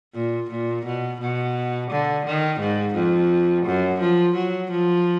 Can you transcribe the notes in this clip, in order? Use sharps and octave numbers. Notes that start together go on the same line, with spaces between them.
A#2
A#2
B2
B2
D3
D#3
G#2
F2
F#2
F3
F#3
F3